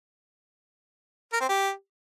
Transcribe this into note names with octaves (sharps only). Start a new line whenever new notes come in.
A#4
C4
G4